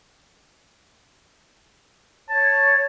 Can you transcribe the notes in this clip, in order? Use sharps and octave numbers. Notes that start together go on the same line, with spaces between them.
C#5 A5